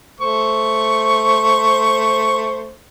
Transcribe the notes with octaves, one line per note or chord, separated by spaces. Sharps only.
A3 C5 C#6